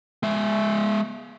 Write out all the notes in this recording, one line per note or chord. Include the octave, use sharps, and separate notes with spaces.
G#3 E5